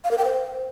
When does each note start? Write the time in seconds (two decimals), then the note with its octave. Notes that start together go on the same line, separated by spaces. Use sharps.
0.04 F5
0.11 A#4
0.18 G5
0.25 C5